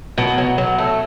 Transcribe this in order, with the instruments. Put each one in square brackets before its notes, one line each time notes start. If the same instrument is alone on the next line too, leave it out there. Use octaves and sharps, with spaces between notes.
[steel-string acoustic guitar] B2 [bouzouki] F#3
[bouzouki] F#3
F#3
A3